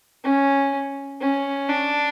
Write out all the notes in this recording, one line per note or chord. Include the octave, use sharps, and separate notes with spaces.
C#4
C#4
D4